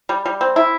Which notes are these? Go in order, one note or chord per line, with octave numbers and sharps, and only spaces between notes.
G3
G3
C4
E4